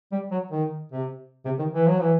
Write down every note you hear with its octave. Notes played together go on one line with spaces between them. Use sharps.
G3
F#3
D#3
C3
C3
D#3
E3
F#3
E3